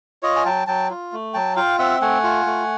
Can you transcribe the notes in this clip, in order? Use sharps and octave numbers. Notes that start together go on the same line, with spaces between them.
F4 C#5 D#5
G#5
F#3 G5 A5
F#3 G5 A5
F4
A3
F#3 G5 A5
F4 F5 G5
C4 E5 F#5
A3 F#5 G#5
F4
A3